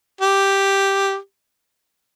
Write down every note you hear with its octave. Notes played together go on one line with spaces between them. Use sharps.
G4